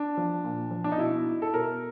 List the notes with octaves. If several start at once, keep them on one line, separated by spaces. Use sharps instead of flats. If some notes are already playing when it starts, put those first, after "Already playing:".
Already playing: D4
F3
A#2
F3
D4
D#4
B2 E4
A4
B2 A#4